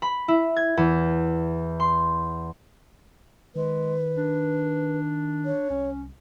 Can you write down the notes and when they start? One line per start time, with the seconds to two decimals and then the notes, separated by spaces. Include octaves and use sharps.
0.02 B5
0.28 E4
0.56 G#6
0.77 E2
1.80 C6
3.55 D#3 G#3 B4
4.17 D4
5.45 C#5
5.70 C2 C#4